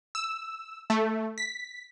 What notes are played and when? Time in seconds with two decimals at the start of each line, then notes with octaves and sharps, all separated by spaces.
0.15 E6
0.90 A3
1.38 B6